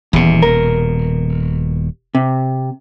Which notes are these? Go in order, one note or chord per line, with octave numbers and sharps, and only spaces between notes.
D#1 E2 B2
A#4
C3